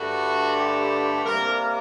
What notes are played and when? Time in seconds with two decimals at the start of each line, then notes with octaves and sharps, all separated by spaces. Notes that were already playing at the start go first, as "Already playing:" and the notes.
Already playing: G2 D3 A3 F#4
0.56 G4
1.24 C3 G3 A#3 A#4